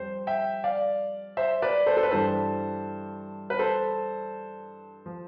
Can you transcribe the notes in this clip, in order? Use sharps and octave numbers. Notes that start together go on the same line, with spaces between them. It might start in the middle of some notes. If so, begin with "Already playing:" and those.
Already playing: F2 G3 C5
E5 G5
D5 F5
C5 E5
B4 D5
A4 C5
A4
B4
G2 E3 G3 A4 C5
B4
A4 C5
F3